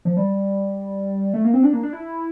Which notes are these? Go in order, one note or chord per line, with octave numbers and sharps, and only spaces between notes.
F3
G3
A3
A#3
C4
D4
A#3
D4
E4